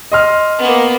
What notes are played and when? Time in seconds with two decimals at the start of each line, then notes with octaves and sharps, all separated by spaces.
0.12 D#5 C6 F6
0.58 A#3 B3